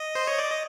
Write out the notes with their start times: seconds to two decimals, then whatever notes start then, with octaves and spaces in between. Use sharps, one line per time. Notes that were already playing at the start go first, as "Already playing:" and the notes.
Already playing: D#5
0.15 C5
0.27 C#5
0.38 D5
0.50 D#5